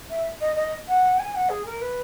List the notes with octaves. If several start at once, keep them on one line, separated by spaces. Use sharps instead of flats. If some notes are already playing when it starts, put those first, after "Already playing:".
E5
D#5
D#5
F#5
G#5
F#5
G#4
A#4
B4